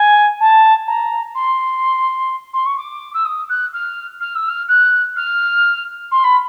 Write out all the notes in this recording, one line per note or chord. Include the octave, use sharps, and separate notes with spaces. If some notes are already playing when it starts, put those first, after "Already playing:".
Already playing: G#5
A5
A#5
C6
C6
C#6
D6
E6
D#6
F#6
F6
F6
E6
F6
F#6
F6
C6
B5